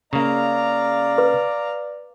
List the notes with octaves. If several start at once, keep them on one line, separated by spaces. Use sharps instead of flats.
C#3 A#3 D5 F5 A#5
B4